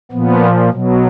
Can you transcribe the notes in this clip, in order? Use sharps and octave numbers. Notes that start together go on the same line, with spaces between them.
A#2 F3 B3
B2 F#3